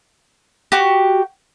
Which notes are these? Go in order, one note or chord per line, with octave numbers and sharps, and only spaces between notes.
F#4 G4